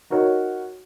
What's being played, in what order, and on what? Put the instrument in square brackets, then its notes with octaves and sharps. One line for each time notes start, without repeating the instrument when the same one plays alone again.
[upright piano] D#4 F#4 A#4 C#5